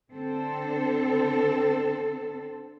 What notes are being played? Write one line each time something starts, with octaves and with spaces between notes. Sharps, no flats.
D3 C4 A4